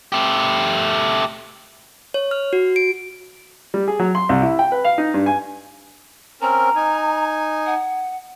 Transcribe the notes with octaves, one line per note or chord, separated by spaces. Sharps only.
A3 G4
C#5
F6
F#4
D7
G3
G#4
F#3
C6
C2
E4
G5
B4
F5
D#4
G2
G#5
C4 C#4 A#4 A#5
D#4 G#5
F#5